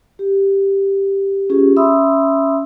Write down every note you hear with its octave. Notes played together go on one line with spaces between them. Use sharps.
G4
C#4 F4 G4 G#4
C#4 E5 B5 C6 D#6 E6